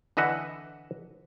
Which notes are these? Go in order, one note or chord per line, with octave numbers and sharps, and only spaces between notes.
D3 E3 D#5 E5 F#5